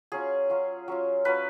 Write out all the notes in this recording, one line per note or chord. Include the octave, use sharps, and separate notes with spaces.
F#3 C#4 F4 G#4
F#3 C#4 F4
F#3 C#4 F4
F#3 C#4 F4 B4